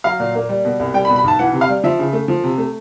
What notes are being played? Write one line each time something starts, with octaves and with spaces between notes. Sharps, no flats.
F#3 F5
A#2
A#3
G3
B2
C2
G3 G5
B5
B2
B5
B1 A5
E3 F#5
C3
F5
G3
F3 E5
C#3
A3
F3
C3
A3